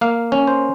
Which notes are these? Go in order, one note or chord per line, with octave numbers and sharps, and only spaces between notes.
A#3 F5
C#4
C5